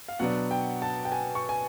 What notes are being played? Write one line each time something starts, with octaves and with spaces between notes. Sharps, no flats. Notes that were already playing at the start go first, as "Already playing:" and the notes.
F5
B2 F#3 B3 D4 F#5
G5
A5
G5
G#5
C#6
G#5